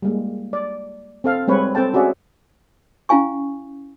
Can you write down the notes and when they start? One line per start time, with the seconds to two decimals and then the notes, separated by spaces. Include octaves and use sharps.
0.02 G3 G#3 A#3
0.53 D5
1.24 C4 A4 F5
1.48 G3 G#3 C4 B4 C#5
1.75 C4 A4 G5 A5
1.94 C#4 F#4 G#4 D5 E5
3.09 C#4 E4 F5 G#5 C#6